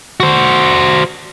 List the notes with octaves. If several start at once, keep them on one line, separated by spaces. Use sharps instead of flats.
F#4 C5